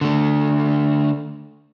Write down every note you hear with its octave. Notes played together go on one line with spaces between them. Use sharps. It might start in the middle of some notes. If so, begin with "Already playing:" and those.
D3 A3